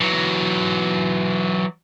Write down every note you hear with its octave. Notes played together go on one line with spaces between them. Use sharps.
E3 F#3